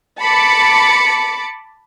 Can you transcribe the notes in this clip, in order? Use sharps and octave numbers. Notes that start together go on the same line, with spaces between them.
A5 B5 D6 C#7